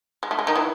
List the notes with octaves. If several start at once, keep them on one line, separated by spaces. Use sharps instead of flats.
G#3
A3
G#3
D#3 D#4
E3 E4